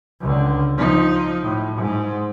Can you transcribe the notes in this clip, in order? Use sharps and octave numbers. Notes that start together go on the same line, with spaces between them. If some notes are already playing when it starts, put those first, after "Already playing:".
C#2 D3
F3 D#4
A2
G#2